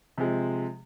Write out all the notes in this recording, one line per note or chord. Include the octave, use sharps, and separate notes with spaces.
C3 F3 G#3